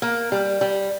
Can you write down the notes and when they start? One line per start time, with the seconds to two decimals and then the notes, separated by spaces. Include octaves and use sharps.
0.02 A#3
0.32 G3
0.61 G3